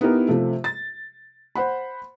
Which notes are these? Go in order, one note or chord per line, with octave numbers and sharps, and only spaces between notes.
B3 D#4 E4 G4 A#4
C3 F3 A3
A6
C5 F#5 B5